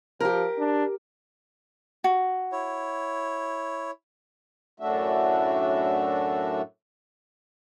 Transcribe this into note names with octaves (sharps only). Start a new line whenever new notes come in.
F3 G4 A#4
D4
F#4
E4 C#5
F#2 A2 A3 D4 F#4 E5